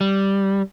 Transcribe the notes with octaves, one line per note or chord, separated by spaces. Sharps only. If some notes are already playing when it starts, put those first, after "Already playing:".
G3